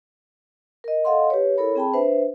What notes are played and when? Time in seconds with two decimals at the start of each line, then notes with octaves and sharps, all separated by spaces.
0.84 A#4 D#5
1.05 A4 D#5 F5 F#5 C6
1.30 G4 B4 C#5
1.58 E4 A4 A#4 C#5 B5
1.76 C4 G#4 G5 A5 B5
1.93 D4 B4 C5 E5